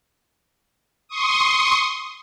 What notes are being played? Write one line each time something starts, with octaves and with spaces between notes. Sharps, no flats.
C6 C#6 D#6